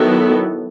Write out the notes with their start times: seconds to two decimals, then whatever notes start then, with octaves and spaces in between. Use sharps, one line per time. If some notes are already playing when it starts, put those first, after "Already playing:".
Already playing: D#3 F#3 B3 E4 A4